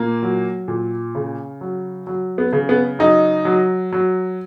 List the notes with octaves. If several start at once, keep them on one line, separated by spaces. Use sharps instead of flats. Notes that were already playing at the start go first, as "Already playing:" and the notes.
Already playing: A#2 A#3
F#3
A#2
C#3
F#3
F#3
B3
C#3
B3
F#3 D#4
F#3
F#3